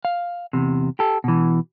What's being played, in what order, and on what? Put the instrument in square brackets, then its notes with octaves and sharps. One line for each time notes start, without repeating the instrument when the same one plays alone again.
[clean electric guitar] F5
E2 C3
G4 A4
B2 E3